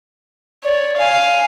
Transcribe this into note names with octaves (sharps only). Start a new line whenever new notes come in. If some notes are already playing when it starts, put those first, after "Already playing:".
C#5 D5
F5 G#5